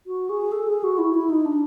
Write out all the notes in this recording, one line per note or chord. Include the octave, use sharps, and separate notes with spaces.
F#4
G#4
A4
G#4
F#4
E4
E4
D#4
D4